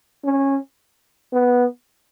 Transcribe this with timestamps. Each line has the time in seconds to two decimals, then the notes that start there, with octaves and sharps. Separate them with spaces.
0.24 C#4
1.33 B3